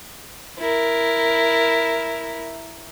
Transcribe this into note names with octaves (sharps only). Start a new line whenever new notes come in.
E4 A#4